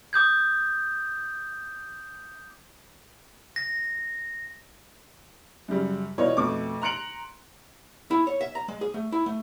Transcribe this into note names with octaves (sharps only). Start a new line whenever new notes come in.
D6 D#6 G6 G#6
A#6
F#2 C#3 G3
B2 E3 D#4 F4 C#5 D5
F2 B2 A3 C#6 D6
A#5 C6 F#6 C#7 D7 F#7
E4
C#5
E5
A#5
G#3
G#4
A3
E4
A3